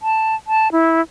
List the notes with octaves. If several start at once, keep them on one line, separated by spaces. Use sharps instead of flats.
A5
A5
E4